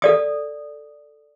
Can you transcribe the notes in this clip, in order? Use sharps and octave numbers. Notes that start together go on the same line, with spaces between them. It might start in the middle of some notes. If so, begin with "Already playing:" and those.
A4 D5 D#6